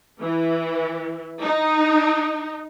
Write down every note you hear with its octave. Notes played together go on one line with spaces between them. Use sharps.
E3
D#4